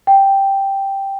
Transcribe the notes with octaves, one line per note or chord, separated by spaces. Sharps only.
G5